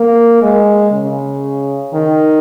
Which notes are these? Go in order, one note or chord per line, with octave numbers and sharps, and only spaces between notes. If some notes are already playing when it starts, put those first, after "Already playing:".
Already playing: A#3
G#3
C#3
D#3